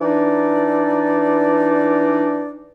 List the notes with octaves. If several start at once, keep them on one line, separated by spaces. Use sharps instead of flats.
E3 D4 D#4 D5